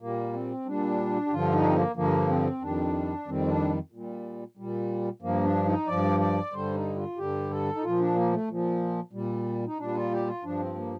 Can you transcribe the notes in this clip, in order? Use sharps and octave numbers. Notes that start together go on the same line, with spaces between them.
A#2 G3 A#3
C4
A#2 G3 D4
G4
G2 D3 F3 F4
D#4
D4
C4
A#3
G2 D3 F3 A#3
C4
F2 D#3 G3 D4
F2 D#3 G3 C4
D4
A#2 G3
A#2 G3
G2 F3 A#3
D4
D#4
G2 F3 D5
D5
G2 D3 G3 C5
D#4
F4
G2 D3 G3 G4
A4
D#4
A#2 F3 F4
D4
A#3
A3
A#2 F3
A#2 G3
D#4
A#2 G3 D4
F4
G4
F4
G2 F3 D4
C4
A#3